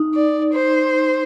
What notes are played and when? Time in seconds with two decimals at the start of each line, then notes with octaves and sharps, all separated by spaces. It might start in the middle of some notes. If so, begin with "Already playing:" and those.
Already playing: D#4
0.15 D5
0.54 C5